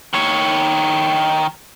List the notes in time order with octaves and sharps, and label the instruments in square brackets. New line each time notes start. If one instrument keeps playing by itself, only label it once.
[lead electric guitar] D#3 C#5